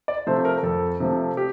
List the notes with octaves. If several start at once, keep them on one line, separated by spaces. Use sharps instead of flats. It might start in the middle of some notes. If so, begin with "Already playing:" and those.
D5
C3 F3 A3 C5
A#4
F2 A4
C3 F3 A3
G4